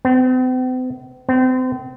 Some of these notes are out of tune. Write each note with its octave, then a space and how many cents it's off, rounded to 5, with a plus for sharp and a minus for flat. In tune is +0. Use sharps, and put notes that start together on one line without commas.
C4 -45
C4 -35